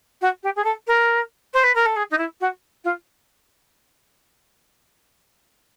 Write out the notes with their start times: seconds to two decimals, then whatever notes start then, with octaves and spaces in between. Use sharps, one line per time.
0.21 F#4
0.43 G4
0.55 G#4
0.64 A4
0.87 A#4
1.53 C5
1.63 B4
1.74 A#4
1.85 A4
1.96 G#4
2.10 D#4
2.17 E4
2.40 F#4
2.84 F4